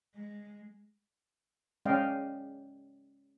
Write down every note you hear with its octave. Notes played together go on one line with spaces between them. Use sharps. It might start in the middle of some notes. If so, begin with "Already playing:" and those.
G#3
G#3 C#4 D5 D#5 F5 G5